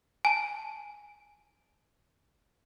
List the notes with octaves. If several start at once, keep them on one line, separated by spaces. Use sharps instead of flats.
G#5 A5